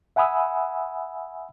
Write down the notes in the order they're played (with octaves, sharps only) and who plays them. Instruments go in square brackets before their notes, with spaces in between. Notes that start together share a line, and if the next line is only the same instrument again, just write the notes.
[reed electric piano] E5 F#5 G#5 B5 D#6 E6